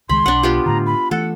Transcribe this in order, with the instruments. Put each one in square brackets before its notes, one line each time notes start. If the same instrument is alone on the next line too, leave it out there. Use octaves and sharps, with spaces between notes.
[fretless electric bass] C#2 D#3 G#3 [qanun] B5 [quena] C6
[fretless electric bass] B1 [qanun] D4 F#5
[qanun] B3 F4 G4
[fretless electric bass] A2 D3 [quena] A#5
[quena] B5
[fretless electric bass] E3 A3 [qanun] A4 [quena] F#5